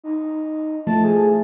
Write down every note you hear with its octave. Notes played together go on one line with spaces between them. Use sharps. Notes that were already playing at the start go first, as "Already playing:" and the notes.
D#4
F3 A3 A5
G#4